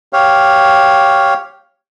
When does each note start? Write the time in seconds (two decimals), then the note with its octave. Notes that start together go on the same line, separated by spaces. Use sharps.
0.13 G4 C#5 F5